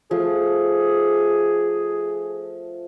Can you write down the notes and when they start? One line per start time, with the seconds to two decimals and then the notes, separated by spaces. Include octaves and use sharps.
0.11 F3 A3 G#4